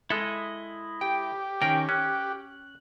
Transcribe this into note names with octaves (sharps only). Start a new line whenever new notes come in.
G#3 E4 A4 D#5
G4 G5
D#3 C#4 A#4 G5
C#4 F#6